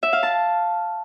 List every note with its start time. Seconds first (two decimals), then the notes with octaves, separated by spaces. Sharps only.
0.03 E5
0.13 F5
0.23 A5